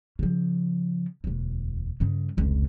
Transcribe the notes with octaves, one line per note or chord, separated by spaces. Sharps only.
C#3 F3
E1 D2
G2 C#3
F1 C#2